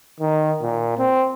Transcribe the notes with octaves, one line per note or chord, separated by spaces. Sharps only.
D#3
A#2
C4